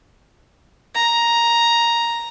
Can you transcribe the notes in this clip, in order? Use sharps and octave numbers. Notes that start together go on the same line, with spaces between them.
A#5